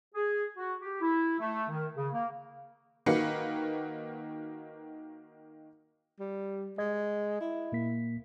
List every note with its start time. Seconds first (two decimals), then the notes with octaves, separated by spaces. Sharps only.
0.15 G#4
0.57 F#4
0.81 G4
1.01 E4
1.39 A3
1.69 D#3
1.96 C#3
2.13 A#3
3.06 D#3 A#3 F#4 B4 C7 C#7
6.20 G3
6.78 G#3 D#5 G#6
7.41 E4
7.72 A#2 A#3 B6